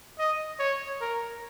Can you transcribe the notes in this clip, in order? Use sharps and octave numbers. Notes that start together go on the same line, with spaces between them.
D#5
C#5
A#4